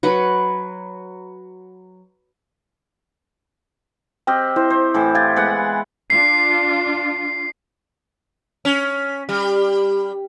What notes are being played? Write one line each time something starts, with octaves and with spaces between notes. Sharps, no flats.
F#3 B4 F#5 B5
C4 G4 D#5 G5 F6
E4 C5
C5
A2 E3
G4 F5 G#6 A6
G#3 B3 F#5
D4 F4 C7
C#4
G3